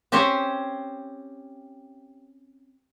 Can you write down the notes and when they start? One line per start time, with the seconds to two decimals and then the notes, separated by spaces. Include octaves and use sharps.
0.12 C4 C#4 G4 C5 C#5